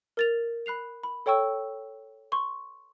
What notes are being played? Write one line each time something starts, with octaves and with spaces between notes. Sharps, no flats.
A#4 A6 F7
B5 F#6 C7 F7
B5
A4 C#5 G5 C#6 E6
C6 C#6